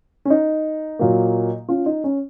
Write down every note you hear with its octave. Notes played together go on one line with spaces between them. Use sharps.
C#4
D#4
A#2 F#3 A#3
C#4 F4
D#4
C#4